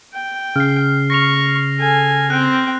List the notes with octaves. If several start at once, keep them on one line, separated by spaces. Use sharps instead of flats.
G5
C#3 F6 C7
C#6 A#6 C7 F7
A4 G#5
C4 G5 F#6